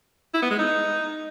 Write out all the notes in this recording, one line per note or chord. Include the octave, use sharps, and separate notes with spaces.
E4
B3
G#3
D#4